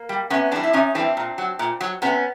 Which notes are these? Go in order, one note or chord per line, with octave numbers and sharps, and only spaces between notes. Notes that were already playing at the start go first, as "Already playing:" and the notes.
Already playing: A#3
G3
C3 B3 C#4
E3 G3 C4 D4
E4
C3 C#4 D#4
E3 G3 C4 D4
A#2
F#3
A#2
F#3
C3 B3 C#4